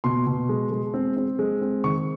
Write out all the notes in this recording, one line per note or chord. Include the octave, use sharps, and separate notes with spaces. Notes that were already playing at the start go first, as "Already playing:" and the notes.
B2 C6
B2
G#3
G#3
C4
C4
G#3
C4
D#3 C#6